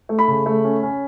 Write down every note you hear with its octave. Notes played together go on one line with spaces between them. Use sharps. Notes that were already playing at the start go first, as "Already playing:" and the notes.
A3
B5
C#3
A3
C#4
C#4